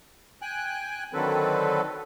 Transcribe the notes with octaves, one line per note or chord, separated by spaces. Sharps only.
G5 G#5 F#6
D3 D#3 F#3 C4 A4 B4